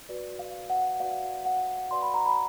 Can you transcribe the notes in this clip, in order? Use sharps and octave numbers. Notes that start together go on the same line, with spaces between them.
F#4 B4 D5
F5
F#5
F#4 B4 D5 F5
F#5
F#4 B4 D5 C6
B5
A#5
B5